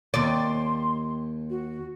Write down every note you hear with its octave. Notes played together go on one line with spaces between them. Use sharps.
D#2 D5 C6
F#4